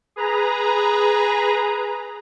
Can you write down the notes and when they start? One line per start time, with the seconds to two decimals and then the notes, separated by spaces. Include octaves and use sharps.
0.16 G#4 B4 A#5